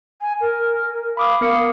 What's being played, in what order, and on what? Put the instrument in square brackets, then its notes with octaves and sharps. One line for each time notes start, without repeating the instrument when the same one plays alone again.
[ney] G#5
A#4
[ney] F5 [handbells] B5 D6 D#6
[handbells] B3 A#4 C#7 [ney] F5